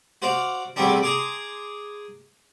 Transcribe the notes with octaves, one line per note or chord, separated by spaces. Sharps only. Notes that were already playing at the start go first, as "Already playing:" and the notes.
F#4 C5 D5 F5
E2 B2 G3 A3 C4 D4
G#4 A#5 C6 D6